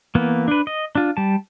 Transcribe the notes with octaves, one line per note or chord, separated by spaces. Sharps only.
E3 A#3 B3
D4 B4
D#5
D4 F4
G3 A5